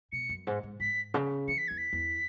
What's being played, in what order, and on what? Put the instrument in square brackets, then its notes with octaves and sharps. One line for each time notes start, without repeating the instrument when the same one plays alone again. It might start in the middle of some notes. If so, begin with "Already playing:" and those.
[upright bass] B2 [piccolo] C#7
[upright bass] F#2
G#2
G#2
[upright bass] G#2 [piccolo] B6
[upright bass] C#3
[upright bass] E3 [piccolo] C#7
[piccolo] B6
[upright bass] E2 [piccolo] G#6
[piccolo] B6
[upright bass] E2